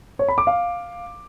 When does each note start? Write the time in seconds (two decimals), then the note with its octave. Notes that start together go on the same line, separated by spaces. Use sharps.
0.19 C#5
0.29 B5
0.38 D6
0.47 F5